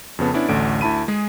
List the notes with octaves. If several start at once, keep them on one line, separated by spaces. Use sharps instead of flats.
F2 C#3 B3 A5
B3 C#4 D4 E4 D5
A1 D2 D3 D7
D2 E4 A5 B5 D#7
G#3 G#4